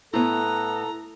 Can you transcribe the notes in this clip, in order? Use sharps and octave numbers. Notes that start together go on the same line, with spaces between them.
A2 B3 E4 A4 A#5